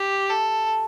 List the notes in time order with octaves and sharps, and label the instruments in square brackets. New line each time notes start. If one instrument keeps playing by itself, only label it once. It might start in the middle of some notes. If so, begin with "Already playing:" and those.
Already playing: [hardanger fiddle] G4
A4